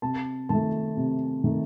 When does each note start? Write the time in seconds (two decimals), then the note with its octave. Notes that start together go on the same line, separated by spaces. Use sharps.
0.02 C3 A5
0.49 D#3 A3 A5
0.97 C3
1.44 D#3 A3